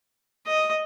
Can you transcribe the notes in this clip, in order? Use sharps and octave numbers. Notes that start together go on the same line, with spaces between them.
D#5